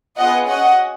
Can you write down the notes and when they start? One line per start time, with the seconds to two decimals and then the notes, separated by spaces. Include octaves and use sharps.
0.17 B3 F4 G#4 D#5 F#5
0.47 C#4 F#4 D#5 F#5